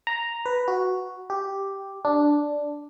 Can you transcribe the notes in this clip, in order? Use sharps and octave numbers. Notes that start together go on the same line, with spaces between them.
A#5
B4
F#4
G4
D4